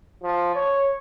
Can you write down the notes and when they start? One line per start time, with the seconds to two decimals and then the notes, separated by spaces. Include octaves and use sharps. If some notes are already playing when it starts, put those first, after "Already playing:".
0.23 F3
0.55 C#5